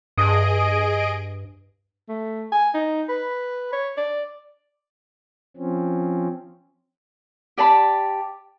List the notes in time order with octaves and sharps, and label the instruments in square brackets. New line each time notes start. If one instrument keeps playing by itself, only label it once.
[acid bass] G2 [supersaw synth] G#4 D#5 D7 [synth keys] D#6
[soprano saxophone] A3
G#5
D#4
B4
C#5
D5
[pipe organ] F3 C4 C#4
[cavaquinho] G4 D5 A5 B5